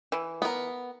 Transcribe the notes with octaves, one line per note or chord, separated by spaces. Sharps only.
E3
B3 A#4